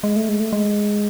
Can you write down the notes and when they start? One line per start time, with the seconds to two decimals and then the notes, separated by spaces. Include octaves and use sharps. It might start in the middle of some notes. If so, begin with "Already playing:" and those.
0.04 G#3
0.16 A3
0.29 G#3
0.40 A3
0.53 G#3